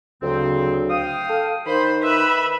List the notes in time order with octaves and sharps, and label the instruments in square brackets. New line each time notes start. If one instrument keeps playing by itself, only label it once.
[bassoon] D2 [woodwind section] C#3 F#3 C4
[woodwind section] F5 G5 D#6
[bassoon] A4
[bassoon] D#3 [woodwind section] C5 [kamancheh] B5
[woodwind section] B4 [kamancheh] E5 B5